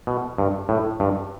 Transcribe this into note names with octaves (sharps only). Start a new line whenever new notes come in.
B2
G2
A2
G2